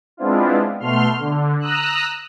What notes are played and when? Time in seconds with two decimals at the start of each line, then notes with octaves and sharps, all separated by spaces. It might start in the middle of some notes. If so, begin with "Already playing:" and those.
0.17 G#3 B3 C4 D4 E4 F4
0.80 B2 A3 C6 F6
1.19 D3
1.60 A#5 D#6 E6 F#6